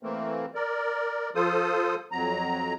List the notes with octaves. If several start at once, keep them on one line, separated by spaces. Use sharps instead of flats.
E3 A3 A#3 C4
A#4 D5
F3 F4 A4 C5 D#6
F2 F#3 A#5